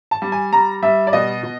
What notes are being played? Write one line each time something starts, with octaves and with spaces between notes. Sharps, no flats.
A5
G3
G#5
G3 A#5
G3 E5
D5
B2 D#5
B2